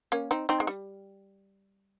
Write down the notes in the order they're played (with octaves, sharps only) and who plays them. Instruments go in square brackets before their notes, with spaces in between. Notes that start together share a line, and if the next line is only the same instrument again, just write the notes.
[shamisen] A#3 C#4
C4 D#4
C4 D#4
G#3
G3